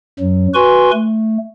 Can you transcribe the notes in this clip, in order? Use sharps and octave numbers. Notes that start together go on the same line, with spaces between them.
F#2 F#3
F#4 B4 G#5 C6 C#6
A3